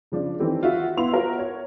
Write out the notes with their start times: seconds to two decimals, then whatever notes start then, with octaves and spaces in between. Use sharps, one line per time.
0.12 C#3 F3 D4
0.39 D#3 E3 C4 G4 A4
0.63 F4 F#4 E5
0.97 B3 E4 F5 C6 F7
1.12 F4 F#4 A#4 C#5 E5 F5
1.39 C#5